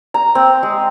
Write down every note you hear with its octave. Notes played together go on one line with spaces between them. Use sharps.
A#5
C4
G#3